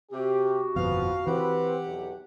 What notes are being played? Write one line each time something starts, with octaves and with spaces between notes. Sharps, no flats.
C3 F#4 G4
G1 F2 B2 F3 B3 B4 F5
E3 C4 G4 B4 F#5
B1 E2